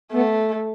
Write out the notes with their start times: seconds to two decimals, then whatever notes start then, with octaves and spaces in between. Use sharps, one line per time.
0.13 A3 B3